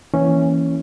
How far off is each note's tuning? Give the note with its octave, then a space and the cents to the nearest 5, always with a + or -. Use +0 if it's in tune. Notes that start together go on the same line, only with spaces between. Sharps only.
E3 +0 A#3 +0 C#4 +0